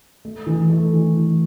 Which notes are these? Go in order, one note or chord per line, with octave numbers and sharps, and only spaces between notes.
A3
E3
A3
E3
E3